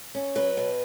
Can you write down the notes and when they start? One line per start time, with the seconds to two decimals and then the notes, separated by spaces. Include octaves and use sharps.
0.15 C#4
0.35 F#3 B4
0.57 B2